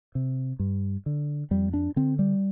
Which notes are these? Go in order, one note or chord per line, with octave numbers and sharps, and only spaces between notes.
C3
G2
D3
F2 G3
D4
D3 C4
G3